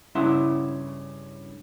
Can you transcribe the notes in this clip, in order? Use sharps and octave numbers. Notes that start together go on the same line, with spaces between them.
G2 C#3 E4 E5 F#5 C6